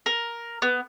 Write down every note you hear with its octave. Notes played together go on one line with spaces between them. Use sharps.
A#4
B3